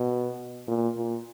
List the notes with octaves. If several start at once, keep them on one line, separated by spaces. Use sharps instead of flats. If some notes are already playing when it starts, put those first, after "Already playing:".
Already playing: B2
A#2
A#2